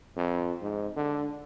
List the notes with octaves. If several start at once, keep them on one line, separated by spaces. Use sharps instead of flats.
F2
G#2
D3